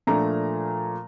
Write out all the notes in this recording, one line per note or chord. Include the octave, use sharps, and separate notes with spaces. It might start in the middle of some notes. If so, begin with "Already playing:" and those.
A#2 F3 A3 D4 A#5